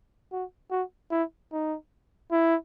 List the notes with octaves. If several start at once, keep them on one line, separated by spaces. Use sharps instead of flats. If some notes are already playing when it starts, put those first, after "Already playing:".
F#4
F#4
E4
D#4
E4